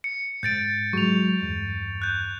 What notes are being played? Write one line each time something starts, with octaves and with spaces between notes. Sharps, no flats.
C#7
G#2 G6 A6 D7
F#3 G#3 C#6 F7
E2 G2
F#6 G6